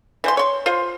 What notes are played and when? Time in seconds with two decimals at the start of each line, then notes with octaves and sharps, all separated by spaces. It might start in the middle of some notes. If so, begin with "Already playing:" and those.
0.24 E3 C5 C6
0.37 C#5 C6
0.66 F4 C5